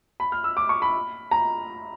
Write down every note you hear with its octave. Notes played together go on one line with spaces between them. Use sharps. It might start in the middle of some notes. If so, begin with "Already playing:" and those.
B5
F6
E6
D6
C#6
B5
A#5